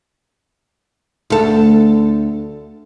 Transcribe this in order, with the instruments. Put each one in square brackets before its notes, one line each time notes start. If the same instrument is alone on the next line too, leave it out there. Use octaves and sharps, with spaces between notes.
[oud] D2 A4